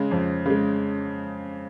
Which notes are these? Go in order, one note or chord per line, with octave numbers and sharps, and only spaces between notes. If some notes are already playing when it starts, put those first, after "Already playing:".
Already playing: C#3 G#3
F2
C#3 G#3